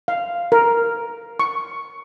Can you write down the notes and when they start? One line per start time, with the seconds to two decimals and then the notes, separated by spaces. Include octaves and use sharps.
0.08 F5
0.52 A#4
1.39 C#6